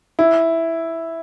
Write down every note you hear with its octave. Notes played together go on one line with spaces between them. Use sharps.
E4